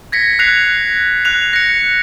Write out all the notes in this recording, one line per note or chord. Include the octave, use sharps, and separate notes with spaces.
G#6 A#6 B6 C#7
F#6 A#6 C7 F7
F#6 F7
A#6 C#7